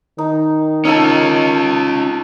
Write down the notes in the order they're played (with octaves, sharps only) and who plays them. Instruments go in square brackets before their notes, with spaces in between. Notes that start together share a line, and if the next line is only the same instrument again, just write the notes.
[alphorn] D#3 [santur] D#4
[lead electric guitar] C#4 F4 [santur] D#4 A4 A5